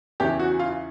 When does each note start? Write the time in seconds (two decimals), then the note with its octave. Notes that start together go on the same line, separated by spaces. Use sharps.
0.20 E2 C#3 E3 G4
0.39 F#4
0.59 F4